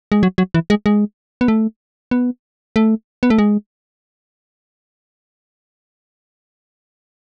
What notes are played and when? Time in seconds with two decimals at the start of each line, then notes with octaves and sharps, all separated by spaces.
0.12 G#3
0.23 F#3
0.38 F#3
0.54 E3
0.70 G#3
0.86 G#3
1.41 B3
1.48 A3
2.11 B3
2.76 A3
3.23 B3
3.30 A3
3.38 G#3